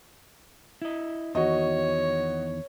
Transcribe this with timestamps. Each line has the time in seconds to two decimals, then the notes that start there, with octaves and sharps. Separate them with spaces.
0.82 E4 D#5
1.35 E2 D#3 F#4 C#5 D#5